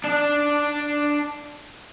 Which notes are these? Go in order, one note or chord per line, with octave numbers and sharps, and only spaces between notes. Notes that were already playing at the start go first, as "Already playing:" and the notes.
D4 D5